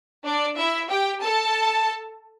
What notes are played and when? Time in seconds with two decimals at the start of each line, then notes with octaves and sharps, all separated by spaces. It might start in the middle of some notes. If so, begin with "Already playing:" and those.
0.24 D4 D5
0.56 E4 E5
0.89 G4 G5
1.21 A4 A5